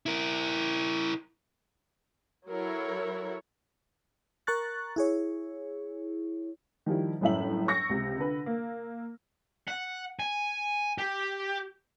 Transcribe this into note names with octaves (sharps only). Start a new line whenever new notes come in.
E4 A#4
F#3 E4 A4 A#4 C#5
A#4 A#5 C#6 F#6 A6
E4 G#4 C#5
D#3 F3 G3 E4
G1 F#2 A2 C#4 E5 F#7
C#6 E6 G6 A#6 C#7
C#2 C3
D3 B4
A#3
F#5
G#5
G4